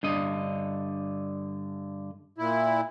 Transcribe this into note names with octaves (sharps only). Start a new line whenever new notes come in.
G2 D3 D#5
A#2 E4